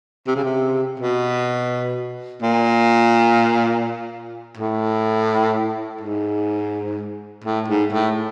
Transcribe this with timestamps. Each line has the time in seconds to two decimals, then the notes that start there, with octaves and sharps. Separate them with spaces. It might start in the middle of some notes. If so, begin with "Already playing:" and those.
0.27 C3
0.36 C#3
0.44 C3
0.99 B2
2.42 A#2
4.58 A2
6.01 G#2
7.44 A2
7.68 G#2
7.93 A2